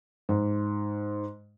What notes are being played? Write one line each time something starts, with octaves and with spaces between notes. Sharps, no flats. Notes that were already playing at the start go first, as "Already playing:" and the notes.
G#2